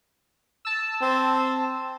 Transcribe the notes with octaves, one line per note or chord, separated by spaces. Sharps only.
A5 E6
C4